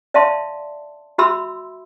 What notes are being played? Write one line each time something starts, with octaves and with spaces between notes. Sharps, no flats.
D5 E5 F5 A5 C6
F#4 E5 B5 C6 E6